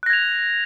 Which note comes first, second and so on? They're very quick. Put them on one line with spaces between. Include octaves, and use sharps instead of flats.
F#6 A#6 G#6 F7